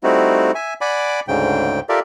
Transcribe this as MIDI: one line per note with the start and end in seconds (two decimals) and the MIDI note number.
0.03 0.51 55
0.03 0.51 57
0.03 0.51 60
0.03 0.51 63
0.03 0.51 64
0.03 0.51 66
0.55 0.74 76
0.55 0.74 80
0.81 1.20 74
0.81 1.20 78
0.81 1.20 80
0.81 1.20 83
0.81 1.20 86
1.28 1.80 38
1.28 1.80 44
1.28 1.80 49
1.28 1.80 79
1.89 2.00 65
1.89 2.00 67
1.89 2.00 69
1.89 2.00 70
1.89 2.00 74
1.89 2.00 76